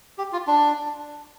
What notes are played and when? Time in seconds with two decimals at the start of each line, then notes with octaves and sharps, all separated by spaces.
0.18 G4
0.33 F4
0.47 D4